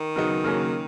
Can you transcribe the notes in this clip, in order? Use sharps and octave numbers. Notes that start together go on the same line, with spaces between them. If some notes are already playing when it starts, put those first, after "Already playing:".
Already playing: D#3
C#3 F#3 B3 D#4
C#3 F#3 A#3 C#4